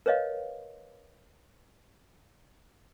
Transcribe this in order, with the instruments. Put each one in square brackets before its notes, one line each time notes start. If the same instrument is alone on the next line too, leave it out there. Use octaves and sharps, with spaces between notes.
[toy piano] A#4 B4 C#5 D#5 F5